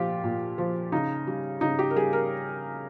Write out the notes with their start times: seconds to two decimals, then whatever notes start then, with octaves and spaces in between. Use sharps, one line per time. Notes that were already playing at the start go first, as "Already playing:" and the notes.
Already playing: A#2 F3 F4 G4
0.24 A#2
0.58 F3
0.92 C#3 D#4
1.27 G3
1.61 C#3 D#4
1.79 G4
1.91 A#4
1.96 G3 G#4
2.13 A#4